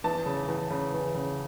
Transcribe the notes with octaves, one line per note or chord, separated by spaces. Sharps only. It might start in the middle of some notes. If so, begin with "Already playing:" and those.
E2 A5
C#3
E2
C#3
E2
C#3